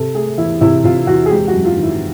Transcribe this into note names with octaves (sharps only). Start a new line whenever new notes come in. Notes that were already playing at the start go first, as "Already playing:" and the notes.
Already playing: C3 A4
A3 G#4
E2 E4
C3 E4
C3 F4
E2 F#4
G#4
G#3 G4
F#4
F#2
F4
D#3
E4